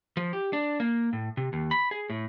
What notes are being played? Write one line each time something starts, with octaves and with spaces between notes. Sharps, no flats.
F3
G4
D4
A#3
A2
C3
D#2
B5
G#4
A2